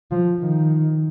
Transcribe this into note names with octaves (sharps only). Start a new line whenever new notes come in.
F3
D#3